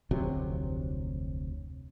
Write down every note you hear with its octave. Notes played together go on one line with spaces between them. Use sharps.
F1 D2 C3 F#3